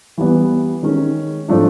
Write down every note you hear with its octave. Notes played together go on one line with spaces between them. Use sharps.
E3 G3 B3
D#3 G#3 C#4
A2 F3 A3 D4